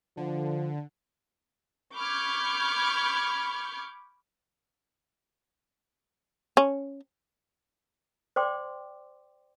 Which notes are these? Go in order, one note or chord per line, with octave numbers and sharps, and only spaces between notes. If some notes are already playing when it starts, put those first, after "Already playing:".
D3 F3
B5 C#6 D6 F6 G6 G#6
C#4
C5 D5 G5 C6 D6